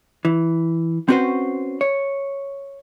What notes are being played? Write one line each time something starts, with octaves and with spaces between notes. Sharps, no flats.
E3
C4 C#4 F#4 B4 C5
C#5